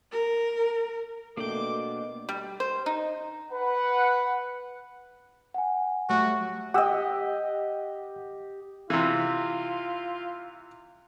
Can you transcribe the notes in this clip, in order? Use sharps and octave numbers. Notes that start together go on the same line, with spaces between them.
A#4
B2 A3 A#3 D4 G5 D6
G3
C5
D#4
B4 F#5
F#5 G#5
F#3 G3 A3 F#4
G4 D#5 F#5 E6
C3 E3 F4